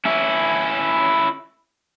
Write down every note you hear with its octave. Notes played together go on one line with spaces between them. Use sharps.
C#4 E4